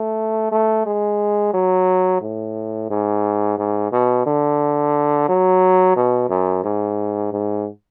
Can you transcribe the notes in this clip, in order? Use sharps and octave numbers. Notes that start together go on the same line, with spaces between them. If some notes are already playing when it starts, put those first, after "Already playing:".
Already playing: A3
A3
G#3
F#3
A2
G#2
G#2
B2
D3
F#3
B2
F#2
G#2
G#2